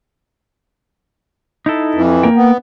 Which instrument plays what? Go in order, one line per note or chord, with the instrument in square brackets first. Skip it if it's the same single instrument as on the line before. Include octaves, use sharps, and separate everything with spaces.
[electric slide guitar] D#4 E4 A4
[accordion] F2 E3
[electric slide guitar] A#3 A#4 G5
[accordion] B3